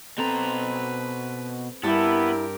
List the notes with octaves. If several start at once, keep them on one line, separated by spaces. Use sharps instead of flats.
B2 C4 A4 B4 A#5
G2 B3 E4 G4 A#4 A5 E6